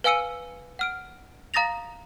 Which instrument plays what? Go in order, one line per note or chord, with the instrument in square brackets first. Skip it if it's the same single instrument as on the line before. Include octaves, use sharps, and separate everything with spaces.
[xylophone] B4 F5 G#5 E6 C#7 D#7
F#5 F6 D7
F5 A#5 D#6 A6 A#6 F7